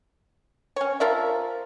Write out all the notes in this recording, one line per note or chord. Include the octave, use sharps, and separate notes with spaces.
C#4 C#5
F3 A#4 E5